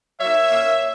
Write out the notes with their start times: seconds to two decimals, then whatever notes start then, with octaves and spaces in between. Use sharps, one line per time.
0.20 F#3 A#3 D#4 C#5 E5
0.52 A#2 A#3 C#4